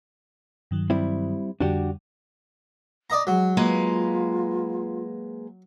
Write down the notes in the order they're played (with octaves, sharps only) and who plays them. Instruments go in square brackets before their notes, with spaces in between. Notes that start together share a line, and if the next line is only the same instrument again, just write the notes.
[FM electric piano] G2 D#3 F#3
[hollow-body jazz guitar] G3 C4 E4
[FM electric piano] F2 D3 G3 [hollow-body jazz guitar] D4 F#4 G4
[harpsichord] D5 D#5 A#5
[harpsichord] F#3 [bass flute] G#3
[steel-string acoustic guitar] G#3 A#3 B4 [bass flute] F4